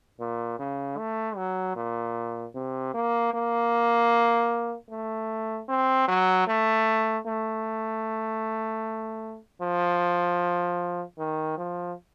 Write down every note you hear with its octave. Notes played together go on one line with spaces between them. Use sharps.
A#2
C#3
A3
F#3
A#2
C3
A#3
A#3
A3
C4
F#3
A3
A3
F3
D#3
F3